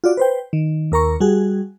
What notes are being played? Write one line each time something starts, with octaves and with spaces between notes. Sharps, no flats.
F4 F#4 D5
B4 C5 G5
D#3
D#2 A#4 A#5 C#6
G3 F#4 G#4